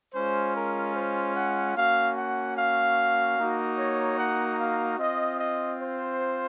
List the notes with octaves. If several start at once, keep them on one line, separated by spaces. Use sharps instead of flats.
G#3 C#4 F4 C5
A#4
C5
F#5
A#3 C#4 F#4 F5
F#5
F5
A#3 D#4 F#4
C#5
F#5
F5
C4 F4 D#5
D#5
C5